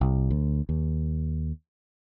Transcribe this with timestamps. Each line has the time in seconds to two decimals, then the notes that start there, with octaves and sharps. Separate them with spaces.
0.01 C2
0.30 D2
0.69 D#2